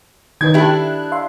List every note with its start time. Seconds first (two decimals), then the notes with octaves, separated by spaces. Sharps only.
0.41 D#3 D#4 B4 G#6
0.54 D4 E4 G4 A4 E5 B5 F#6
1.12 E5 F5 C6